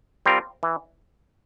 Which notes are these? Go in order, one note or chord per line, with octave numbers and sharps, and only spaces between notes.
G3 C4 F4 A#4
E3